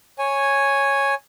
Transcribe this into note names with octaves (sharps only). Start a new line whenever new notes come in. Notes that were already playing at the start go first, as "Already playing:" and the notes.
C#5 G#5